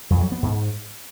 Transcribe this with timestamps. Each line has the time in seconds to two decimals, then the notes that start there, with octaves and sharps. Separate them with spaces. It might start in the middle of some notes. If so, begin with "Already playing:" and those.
0.10 F2
0.21 F#3
0.32 B3
0.42 G#2